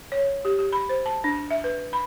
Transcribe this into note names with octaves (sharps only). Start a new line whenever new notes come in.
C#5
G4
G4
B5
C5
A5
D4
E5
B4
B5